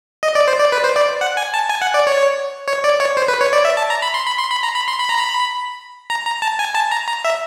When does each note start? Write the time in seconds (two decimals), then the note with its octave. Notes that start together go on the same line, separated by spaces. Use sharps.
0.23 D#5
0.35 D5
0.48 C5
0.60 D5
0.72 B4
0.84 C5
0.96 D5
1.21 F#5
1.37 G#5
1.54 A5
1.70 G#5
1.82 F#5
1.94 D5
2.07 C#5
2.68 C#5
2.84 D5
3.00 C#5
3.17 C5
3.28 B4
3.41 C#5
3.53 D5
3.65 E5
3.77 A5
3.90 A#5
4.02 B5
4.14 C6
4.26 B5
4.39 C6
4.51 B5
4.63 A#5
4.75 B5
4.88 C6
4.99 B5
5.09 A#5
5.18 B5
6.10 A#5
6.26 A#5
6.42 A5
6.59 G#5
6.75 A5
6.91 A#5
7.08 A#5
7.25 E5